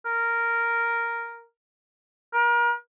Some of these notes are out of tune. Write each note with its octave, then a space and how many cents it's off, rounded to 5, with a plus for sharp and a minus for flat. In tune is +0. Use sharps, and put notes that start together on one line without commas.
A#4 -5
A#4 +35